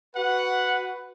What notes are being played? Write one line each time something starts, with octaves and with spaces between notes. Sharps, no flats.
F#4 B4 F#5